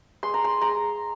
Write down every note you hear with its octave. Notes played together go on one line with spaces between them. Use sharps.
G#3 C6
A#5
C6
G#3 A#5